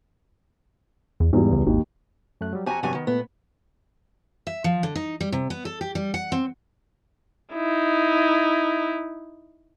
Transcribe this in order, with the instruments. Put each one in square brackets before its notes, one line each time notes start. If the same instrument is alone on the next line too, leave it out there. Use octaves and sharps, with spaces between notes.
[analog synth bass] E2
[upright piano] E2 G3 [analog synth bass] G#2
[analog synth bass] C#2
[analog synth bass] G#1 [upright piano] D#2
[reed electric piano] F#2 A3 F#6
F#3 G3
[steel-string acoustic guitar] F2 F#4 G#5 [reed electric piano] G4 A#5
[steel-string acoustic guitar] E2 G2 G#5 [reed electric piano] C3 F#3 C#6
[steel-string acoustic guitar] D#3 [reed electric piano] B3
[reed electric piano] A#2 A3 [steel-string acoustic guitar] B3
[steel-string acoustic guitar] E5
F3
D3
D#4
G3
C3
B3
A4
G4
G3
F#5
C4
[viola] D#4 E4